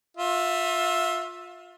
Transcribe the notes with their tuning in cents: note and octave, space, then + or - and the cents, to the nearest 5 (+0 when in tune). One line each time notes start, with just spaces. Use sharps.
F4 +30 E5 +0